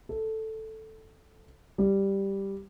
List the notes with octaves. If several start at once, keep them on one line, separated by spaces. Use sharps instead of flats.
A4
G3